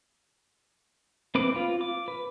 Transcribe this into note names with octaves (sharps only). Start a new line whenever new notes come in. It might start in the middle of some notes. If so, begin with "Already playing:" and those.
C4 B4 D6
F4
D6
B4